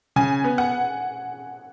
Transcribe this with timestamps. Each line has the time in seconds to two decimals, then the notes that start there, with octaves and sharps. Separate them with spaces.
0.16 C#3 G#5
0.44 B3
0.58 F#5